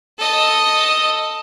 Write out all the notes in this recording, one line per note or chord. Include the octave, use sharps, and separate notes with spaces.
A4 D#5